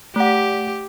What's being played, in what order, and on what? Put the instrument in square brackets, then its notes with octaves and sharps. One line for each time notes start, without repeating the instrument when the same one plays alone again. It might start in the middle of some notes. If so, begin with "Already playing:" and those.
[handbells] A3 F#5 [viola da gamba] G4